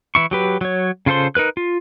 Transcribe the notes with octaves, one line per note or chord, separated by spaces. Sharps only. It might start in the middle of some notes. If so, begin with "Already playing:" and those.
E3 E4 C#6
F#3 G4 B4
F#3 C#5
C#3 F4 A4 C5 C6
D#4 A#4 B4 F#6
F4